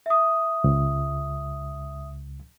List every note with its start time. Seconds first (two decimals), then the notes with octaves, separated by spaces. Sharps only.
0.06 E5 D#6
0.64 C#2